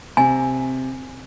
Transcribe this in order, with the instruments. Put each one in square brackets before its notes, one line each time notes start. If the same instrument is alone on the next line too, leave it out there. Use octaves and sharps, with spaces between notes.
[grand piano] C3 [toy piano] G#5